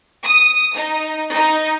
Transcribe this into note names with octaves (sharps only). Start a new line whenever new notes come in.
D#6
D#4
D#4